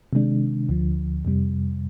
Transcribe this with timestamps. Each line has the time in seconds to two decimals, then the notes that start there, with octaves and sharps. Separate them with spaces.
0.13 C3 D#3 G#3 D4
0.69 D2 D3 F3
1.25 F2 C3 G3